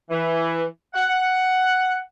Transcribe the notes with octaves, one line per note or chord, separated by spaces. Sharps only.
E3
F#5